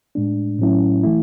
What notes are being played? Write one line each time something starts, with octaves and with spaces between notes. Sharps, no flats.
A2 G#3 D4
A2 F#3 C#4 E4
E3 A3 E4